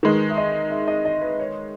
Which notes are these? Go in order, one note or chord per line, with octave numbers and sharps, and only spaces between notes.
D#3 G#3 D#4 B4
E5
D#5
E5
D#5
D#5
B4
C#5